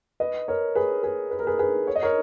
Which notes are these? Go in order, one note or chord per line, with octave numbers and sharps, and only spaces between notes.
B4 D#5
A#4 C#5
G#4 B4
G#4 B4
B4
A#4
G#4 B4
G#4 B4
C#5
D#5
A#4 C#5